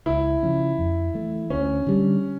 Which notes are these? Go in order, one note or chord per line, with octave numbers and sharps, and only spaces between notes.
C#2 E4
C#3 F3 C#4
F2
E3 A3
D2 C#4
D3 G3